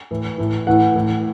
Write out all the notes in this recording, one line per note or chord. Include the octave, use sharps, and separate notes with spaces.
A2 E3
A2 E3
A2 E3 F#5
A2 E3